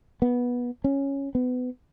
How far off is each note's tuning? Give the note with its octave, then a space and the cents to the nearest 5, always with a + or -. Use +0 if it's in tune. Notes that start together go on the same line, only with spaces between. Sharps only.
B3 -15
C#4 -5
B3 +25